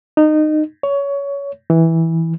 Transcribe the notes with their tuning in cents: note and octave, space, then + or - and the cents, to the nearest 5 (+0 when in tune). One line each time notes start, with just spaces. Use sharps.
D#4 -20
C#5 +20
E3 -10